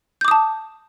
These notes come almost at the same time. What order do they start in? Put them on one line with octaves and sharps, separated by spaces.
G6 D6 D#6 A5